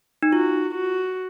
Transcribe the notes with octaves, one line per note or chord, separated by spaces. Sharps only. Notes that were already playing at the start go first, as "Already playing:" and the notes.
D#4
F4 F#4
F#4